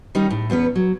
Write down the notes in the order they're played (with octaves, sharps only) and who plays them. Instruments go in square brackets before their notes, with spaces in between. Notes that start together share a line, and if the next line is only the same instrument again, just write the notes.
[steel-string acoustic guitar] D#3 G3 C#4 D#4
A2
E2 B3 C#4 B4
F#3